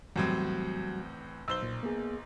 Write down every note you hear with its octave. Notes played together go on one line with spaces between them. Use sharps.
E2 A2 F#3 G3 C4 F#4
B1 C5 E6 G7
A#2
A#3 B3 G#4